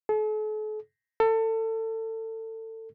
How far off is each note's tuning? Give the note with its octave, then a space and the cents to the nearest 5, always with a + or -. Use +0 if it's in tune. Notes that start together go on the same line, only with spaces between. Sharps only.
A4 -45
A4 +25